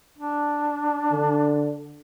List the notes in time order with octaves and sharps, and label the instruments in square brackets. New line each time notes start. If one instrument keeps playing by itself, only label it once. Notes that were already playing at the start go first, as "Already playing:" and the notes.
[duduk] D4
[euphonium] D3